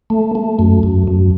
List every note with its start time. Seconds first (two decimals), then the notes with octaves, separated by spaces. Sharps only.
0.10 A3
0.35 A3
0.59 F#2
0.83 F#2
1.08 F#2